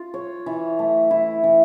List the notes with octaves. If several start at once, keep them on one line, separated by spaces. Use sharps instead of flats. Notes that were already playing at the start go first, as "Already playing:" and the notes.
Already playing: F4
C#5
E3
A3
E4
E3